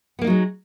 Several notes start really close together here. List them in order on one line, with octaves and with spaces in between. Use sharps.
B3 A#3 D#4 F#3 G#3